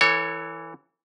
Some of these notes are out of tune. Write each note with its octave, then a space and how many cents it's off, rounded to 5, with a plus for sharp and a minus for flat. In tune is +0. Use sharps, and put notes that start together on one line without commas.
E3 +0 A4 +40 C#5 +0